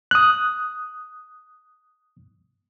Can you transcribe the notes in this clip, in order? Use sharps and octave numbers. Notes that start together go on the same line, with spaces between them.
D#6 F#6